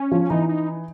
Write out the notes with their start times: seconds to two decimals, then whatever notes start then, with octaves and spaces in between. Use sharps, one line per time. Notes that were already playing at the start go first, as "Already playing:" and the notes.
Already playing: C#4
0.12 F3
0.30 E3 D#4
0.49 D#4